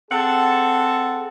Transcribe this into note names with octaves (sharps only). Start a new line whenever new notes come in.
C4 G#4 A4 F#5 A5